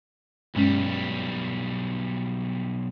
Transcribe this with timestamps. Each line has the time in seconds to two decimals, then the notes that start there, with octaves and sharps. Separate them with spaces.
0.55 B1 G2 G3 G#3 C#4